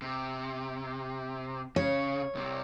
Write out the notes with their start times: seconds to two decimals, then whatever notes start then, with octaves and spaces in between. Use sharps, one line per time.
0.02 C3
1.76 C#3 C#5
2.35 C2 C3